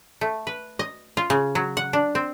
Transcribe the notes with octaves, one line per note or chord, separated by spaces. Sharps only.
A3
B4
D#5
F4
C#3
F#3
F#5
D4
C4